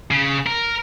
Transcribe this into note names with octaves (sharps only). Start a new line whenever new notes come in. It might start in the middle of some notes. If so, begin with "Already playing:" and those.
C#3
A#4